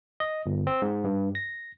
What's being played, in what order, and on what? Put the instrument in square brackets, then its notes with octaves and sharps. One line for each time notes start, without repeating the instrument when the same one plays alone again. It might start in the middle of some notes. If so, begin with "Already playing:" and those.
[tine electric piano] D#5
G1
C4
G#2
G2
A#6